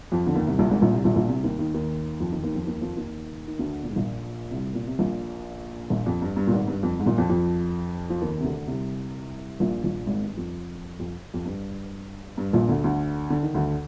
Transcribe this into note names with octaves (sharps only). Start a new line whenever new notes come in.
F2 F3
D3
D#2 D#3
C2 C3
A#1 A#2
G#1 G#2
A#1 A#2
C2 C3
A#1 A#2
A#1 A#2
C2 C3
D#2 D#3
D#2 D#3
D#2 D#3
F2 F3
D#2 D#3
D#2 D#3
F2 F3
D#2 D#3
F2 F3
D#2 D#3
D#3
D2 D3
A#2
G#2
A#1 A#2
C2 C3
A#2
C3
A#1 A#2
A#1 A#2
F2
G2
G2
A#2
G#1 G#2
G2
F2
G#2
A#1 A#2
F2 F3
F2 F3
F3
D#2 D#3
C3
D2 D3
C2 C3
A#1 A#2
A#1 A#2
G#1 G#2
G2
F2
F2
F2
G2
G2
A#1 A#2
D2 D3
D2 D3
D3
D#3
D2 D3